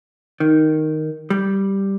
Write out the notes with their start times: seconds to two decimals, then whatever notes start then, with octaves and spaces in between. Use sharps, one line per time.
0.40 D#3
1.30 G3